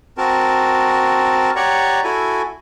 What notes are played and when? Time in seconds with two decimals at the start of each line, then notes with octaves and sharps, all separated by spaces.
0.18 C4 F#4 A#4 A5
1.56 G4 C#5 D5 F#5 A#5 C#6
2.04 E4 F#4 A4 G#5